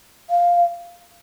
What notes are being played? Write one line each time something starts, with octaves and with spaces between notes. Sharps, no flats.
F5